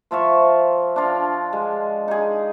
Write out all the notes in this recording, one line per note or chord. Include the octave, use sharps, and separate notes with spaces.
F3 F4 E5 C#6
D4 F4
G#3
D#4 G#4